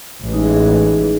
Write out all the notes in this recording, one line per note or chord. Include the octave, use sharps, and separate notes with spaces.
A1 A2 E3 G#3
D#4
G#4
G#4